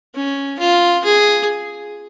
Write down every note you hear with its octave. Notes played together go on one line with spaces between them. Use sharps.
C#4
F4
G#4